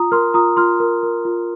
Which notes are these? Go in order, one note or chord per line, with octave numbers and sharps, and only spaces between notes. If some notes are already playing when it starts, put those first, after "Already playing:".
Already playing: F4 A#5 D#6
A#4 C6 F6
F4 A#5 D#6
F4 C6 F6
A#4
A#4
F4